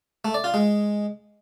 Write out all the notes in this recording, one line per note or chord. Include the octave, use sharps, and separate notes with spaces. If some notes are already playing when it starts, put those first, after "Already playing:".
A3
D5
F4
G#3